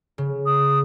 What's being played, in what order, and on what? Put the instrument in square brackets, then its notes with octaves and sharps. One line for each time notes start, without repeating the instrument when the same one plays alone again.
[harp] C#3
[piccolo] D#6